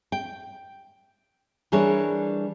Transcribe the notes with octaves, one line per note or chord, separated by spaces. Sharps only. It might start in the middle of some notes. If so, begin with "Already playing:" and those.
G5
E3 G3 D4 G#4 A#4 C#5